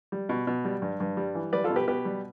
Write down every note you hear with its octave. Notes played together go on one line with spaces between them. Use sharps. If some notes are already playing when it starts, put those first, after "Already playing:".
G3
B2
B2
G3
G2
G2
G3
E3
G3 B4 D5
F4 A4
B2
G4 B4
B2 G4 B4
G3